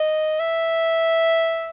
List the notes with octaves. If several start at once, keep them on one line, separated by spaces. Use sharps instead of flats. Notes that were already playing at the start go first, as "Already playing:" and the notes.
Already playing: D#5
E5